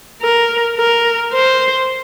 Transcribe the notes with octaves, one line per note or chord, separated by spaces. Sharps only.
A#4
A#4
C5